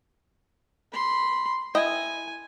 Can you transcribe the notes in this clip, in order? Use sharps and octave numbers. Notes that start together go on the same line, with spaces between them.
B5 C6
E4 D#5 G5 G#5